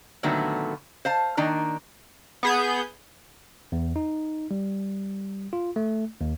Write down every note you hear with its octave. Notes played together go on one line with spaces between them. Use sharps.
A#2 D3 D#3 F#3 A3 B3
C5 F5 A5
D#3 A#3 D4 A#5
B3 G#4 G6
E2
D#4
G3
F4
A3
D#2